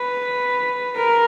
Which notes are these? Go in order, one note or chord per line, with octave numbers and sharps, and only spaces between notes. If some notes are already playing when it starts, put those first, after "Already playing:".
Already playing: B4
A#4